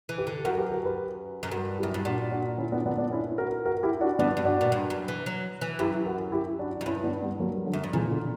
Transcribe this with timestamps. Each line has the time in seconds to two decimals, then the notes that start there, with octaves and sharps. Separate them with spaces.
0.09 E3
0.18 G4 B4
0.27 D3
0.45 F#2 F#4 A#4
0.58 G4 B4
0.71 F#4 A#4
0.85 G4 B4
1.43 F#2
1.51 G2 F#4 A#4
1.78 E4 G4
1.83 F#2
1.94 G2
2.05 A#2 D4 F#4
2.31 D4 F#4
2.58 C#4 E4
2.72 B3 D4
2.86 B3 D4
2.98 B3 D4
3.11 C#4 E4
3.38 F#4 A#4
3.66 F#4 A#4
3.83 E4 G4
4.01 D4 F#4
4.19 G2 B3 D4
4.37 G2
4.45 D4 F#4
4.61 A#2
4.72 G2
4.90 F#2
5.08 E3
5.26 F#3
5.61 E3
5.79 F#2 E4 G4
6.06 F#4 A#4
6.32 E4 G4
6.59 D4 F#4
6.81 F#2
6.86 G2 C#4 E4
7.04 B3 D4
7.21 G3 B3
7.39 F#3 A#3
7.55 G3
7.66 D3 F#3
7.73 F#2
7.84 G2
7.93 A#2 C#3 E3
8.10 B2 D3